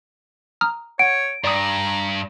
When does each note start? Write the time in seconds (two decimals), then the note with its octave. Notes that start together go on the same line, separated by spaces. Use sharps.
0.61 A#5 D#6 F6
0.99 C#5 F#5 D7
1.44 G2 D5 A#5 D#6